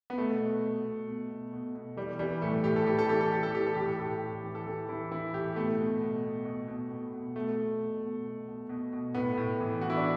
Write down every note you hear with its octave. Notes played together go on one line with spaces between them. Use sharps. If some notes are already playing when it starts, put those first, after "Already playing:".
B3
B2 A3
B2
B2
B2
B2
B2
B2
B2
E3 G3
E3 G3
A2 A3
A2 G4
A4
E3 G4
A4
E3 G4
A4
E3 G4
A4
E3 G4
A4
A2 G4
A4
A2 G4
A2
E3
A4
E3 G4
E3 E4
E3 E4
A2 G4
B2 A3
B2
B2
B2
B2
B2
B2
B2
B2 A3
B2
B2
B2
B2
B2
B2
B2
A2 B3
A2
E3
E3 F#4
E4
D4